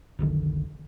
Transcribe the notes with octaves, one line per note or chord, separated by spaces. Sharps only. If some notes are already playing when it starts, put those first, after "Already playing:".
F1 B1 D3 D#3